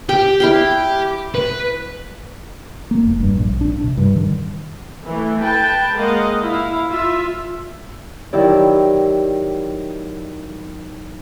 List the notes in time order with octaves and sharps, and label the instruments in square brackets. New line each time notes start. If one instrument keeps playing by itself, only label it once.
[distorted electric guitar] G4 [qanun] G5
[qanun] E4 F5 G5
[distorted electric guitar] B4
[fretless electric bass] A#3
F1
G2
A#1
D4
C3
G2
D#3
[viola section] E3 A3
B4 G5 A5
G#3 A#3 D#5 F5 F#5
E4 F5
F4 E5
[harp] D#3 F#3 E4 G4 D5